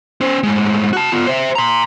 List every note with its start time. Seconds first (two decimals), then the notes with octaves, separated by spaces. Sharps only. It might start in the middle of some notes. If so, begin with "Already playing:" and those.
0.21 C#4 C5
0.43 A2 G#3
0.93 F#4 A5
1.12 B3 F4
1.27 C5 E5
1.55 A#5 C6